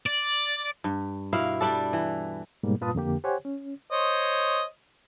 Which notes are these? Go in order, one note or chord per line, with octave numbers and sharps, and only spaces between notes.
D5
G2
B2 A#3 E4 F5
G3 D4 A4
E3
G#2 B2 G3 A#3
G2 A#2 F4 B4 A5 D#6
F2 D3 A#3 G4
G4 C5 C#5 F#5 G#5
C#4
C5 C#5 D#5